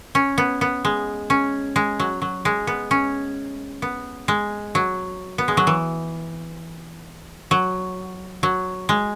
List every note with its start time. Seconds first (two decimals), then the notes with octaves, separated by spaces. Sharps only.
0.15 C#4
0.38 B3
0.61 B3
0.85 G#3
1.30 C#4
1.76 G#3
2.00 F#3
2.22 F#3
2.45 G#3
2.67 B3
2.91 C#4
3.82 B3
4.28 G#3
4.75 F#3
5.38 B3
5.48 G#3
5.57 F#3
5.67 E3
7.51 F#3
8.43 F#3
8.89 G#3